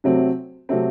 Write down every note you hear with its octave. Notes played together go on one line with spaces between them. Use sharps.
C3 F#3 A3 C4
C3 F#3 A3 C4